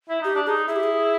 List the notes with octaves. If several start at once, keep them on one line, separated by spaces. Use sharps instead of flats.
E4
D#4 G4
D4
D#4 G#4
E4 G#4
G4
G#4